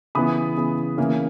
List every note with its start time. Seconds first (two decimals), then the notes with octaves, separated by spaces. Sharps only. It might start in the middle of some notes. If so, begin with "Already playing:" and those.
0.15 C#3 E3 B3 B5 D#6
0.57 C#3 E3 B3
0.97 C#3 E3 A#3 C#4